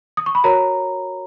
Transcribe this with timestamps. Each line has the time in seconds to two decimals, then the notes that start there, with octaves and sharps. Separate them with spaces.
0.17 D#6
0.26 C#6
0.35 B5
0.44 F#4 A#4 C#5 A#5